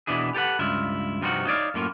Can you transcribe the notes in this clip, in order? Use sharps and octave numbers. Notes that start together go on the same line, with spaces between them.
B2 E3 D4 E4 G#4
G4 A4 B4 F#5
C#2 G2 E4 F4
G2 C3 F3 C4 D#4 F#4
D#4 C#5 D5 E5 F5
F#2 A2 A#3 F4